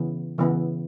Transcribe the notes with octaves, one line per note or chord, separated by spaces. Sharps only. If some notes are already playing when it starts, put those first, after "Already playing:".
Already playing: C#3 E3 B3
C#3 E3 B3